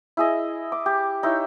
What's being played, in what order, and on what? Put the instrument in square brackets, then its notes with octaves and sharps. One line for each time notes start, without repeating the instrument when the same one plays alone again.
[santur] E4 G#4 D#5
D6
G4
D#4 E4 C#5